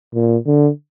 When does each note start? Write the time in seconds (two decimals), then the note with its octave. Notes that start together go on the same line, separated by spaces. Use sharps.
0.14 A#2
0.46 D3